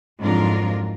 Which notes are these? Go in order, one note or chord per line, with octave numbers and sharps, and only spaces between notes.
F2 G#2 F#3 D4 F4 A#4